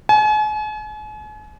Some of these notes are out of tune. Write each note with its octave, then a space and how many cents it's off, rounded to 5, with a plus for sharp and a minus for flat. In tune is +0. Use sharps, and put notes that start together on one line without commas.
G#5 +40